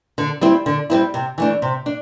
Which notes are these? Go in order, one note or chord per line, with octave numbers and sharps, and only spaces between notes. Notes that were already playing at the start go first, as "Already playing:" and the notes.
D3
G3 C4 E4
D3
G3 C4 E4
C3
E3 A3 D4
C3
D4